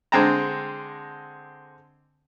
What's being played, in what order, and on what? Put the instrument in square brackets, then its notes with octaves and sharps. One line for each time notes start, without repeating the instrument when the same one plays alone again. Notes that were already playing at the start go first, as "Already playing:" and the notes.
[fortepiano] D3 G#3 C4 G5 A5 A#5